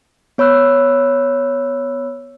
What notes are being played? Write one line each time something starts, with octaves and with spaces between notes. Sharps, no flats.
B3 C#5 B5 E6 F#6